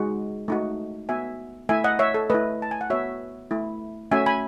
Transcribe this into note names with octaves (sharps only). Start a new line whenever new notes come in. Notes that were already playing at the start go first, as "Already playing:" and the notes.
Already playing: G#3 D#4 F#4
A3 D#4 F#4
B3 F#4 E5 G#5
A3 E4 E5 G#5
D#5 F#5
C#5 E5
A4
A3 E4 B4 D#5
A5
G#5
F#5
B3 F#4 C#5 E5
A3 E4
A3 C#4 F#4 E5 G#5
G#5 B5